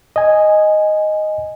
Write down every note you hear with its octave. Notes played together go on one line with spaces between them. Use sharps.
D#5 G#5